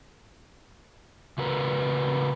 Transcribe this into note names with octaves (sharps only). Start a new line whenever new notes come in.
C#3 F#4 A#4 B4